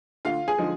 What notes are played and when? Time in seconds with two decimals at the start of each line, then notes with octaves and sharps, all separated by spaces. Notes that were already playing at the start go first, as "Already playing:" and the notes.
0.25 D2 F4 F5
0.48 G#4 G#5
0.58 D3 F3 G#3 D#4